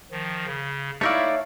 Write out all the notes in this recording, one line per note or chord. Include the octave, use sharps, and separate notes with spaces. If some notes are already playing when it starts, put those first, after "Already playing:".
D#3 F3
C#3
A3 D#4 E4 C#5 D5 E5 F5